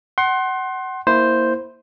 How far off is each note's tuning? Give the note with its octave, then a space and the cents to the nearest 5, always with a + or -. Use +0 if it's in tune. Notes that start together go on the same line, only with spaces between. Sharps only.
F#5 +25 C6 +20
A#3 +0 E4 -10 C5 +0